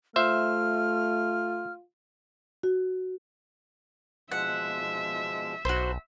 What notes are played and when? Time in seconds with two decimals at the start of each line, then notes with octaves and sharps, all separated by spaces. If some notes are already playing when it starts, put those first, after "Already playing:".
0.16 A3 F4 C5 E5 F6
2.63 F#4
4.32 B2 F3 G#3 E5 F#5
5.65 B1 F#4 C5